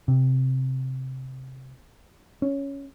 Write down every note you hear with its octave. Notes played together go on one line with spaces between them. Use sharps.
C3
C#4